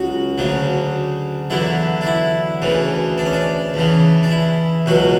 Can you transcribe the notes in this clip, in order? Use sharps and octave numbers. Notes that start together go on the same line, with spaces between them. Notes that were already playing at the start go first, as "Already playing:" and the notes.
Already playing: C#2 C#3 F#3 F#4
D2 C#3 F#3
E2 D3 F#3 E4
D4
E4
D2 C#3 E3
D4
C#4
D4
E2 C#3 E3
D4
E4
C#2 B2 F#3 F#4